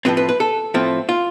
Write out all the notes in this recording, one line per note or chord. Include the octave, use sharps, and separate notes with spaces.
A2 F3 C4 B4
B4
B4
A4
A2 F3 A3 C4
F4